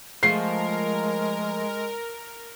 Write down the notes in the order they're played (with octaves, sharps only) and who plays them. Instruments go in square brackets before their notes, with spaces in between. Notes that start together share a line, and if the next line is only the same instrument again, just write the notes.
[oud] F3 A3 G#4 [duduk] G#3 [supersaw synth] A#4 [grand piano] C7